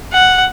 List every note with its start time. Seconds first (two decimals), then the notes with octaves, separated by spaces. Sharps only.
0.13 F#5